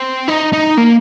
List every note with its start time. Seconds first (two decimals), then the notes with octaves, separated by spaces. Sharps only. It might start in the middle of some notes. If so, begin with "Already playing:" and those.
Already playing: C4
0.28 D#4
0.53 D#4
0.77 A#3